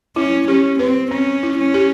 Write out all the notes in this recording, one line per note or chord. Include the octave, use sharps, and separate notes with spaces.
C#4 E4
C#4 G4
C4 B4
C4 C#4
E4
C#4
G4